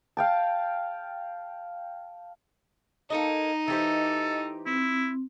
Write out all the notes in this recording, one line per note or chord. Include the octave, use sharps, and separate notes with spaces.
F5 G5 A5
A#3 D#4 A4 D#5
E3 G4 A4 C5 D#5
C4 E4